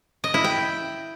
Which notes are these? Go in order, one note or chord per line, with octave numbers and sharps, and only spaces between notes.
D#5
E4
G5